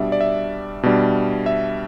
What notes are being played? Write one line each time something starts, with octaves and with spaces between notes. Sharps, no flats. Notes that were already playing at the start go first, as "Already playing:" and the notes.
Already playing: B2 G3 D4 D5 E5
D5
E5
B2 G3 D4
E5